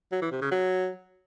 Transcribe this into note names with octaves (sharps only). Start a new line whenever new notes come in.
F#3
E3
C3
C#3
F#3